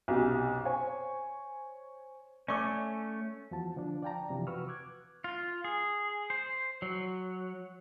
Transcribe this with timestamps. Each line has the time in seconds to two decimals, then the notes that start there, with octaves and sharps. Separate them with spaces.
0.08 B1 F#2 C3
0.64 C5 C#5 G#5
2.48 A3 C#4 D5 C#6 D6
3.51 E2 F3 F#4 A5
3.76 D3 F3 D4
4.02 D5 F5 G5 A5 A#5
4.30 F#2 C3 E3 F3
4.47 F#4 B4 C#6 E6 F6
4.68 D6 F#6 G#6
5.24 F4
5.64 G#4
6.30 C5
6.82 F#3